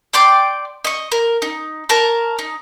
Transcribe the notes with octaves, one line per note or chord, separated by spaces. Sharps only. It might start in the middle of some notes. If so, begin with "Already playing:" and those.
D5 G5 C6 D6
D#5 C#6
A#4
D#4
A#4 C#5 A5 A#5
D#4